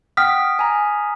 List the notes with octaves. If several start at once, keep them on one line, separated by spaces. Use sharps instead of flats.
F#5 G5 D#6 F6 B6
G#5 A#5